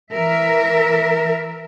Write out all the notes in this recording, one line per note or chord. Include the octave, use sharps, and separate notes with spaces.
E3 A#4 E5